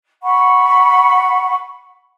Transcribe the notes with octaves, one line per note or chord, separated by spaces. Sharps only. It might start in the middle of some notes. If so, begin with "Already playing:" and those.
F#5 B5 C#6